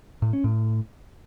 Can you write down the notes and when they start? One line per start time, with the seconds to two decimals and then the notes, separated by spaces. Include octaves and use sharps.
0.22 A2
0.33 C#4
0.44 A2